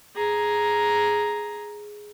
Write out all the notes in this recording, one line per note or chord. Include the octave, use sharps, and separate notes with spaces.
G#4 A#5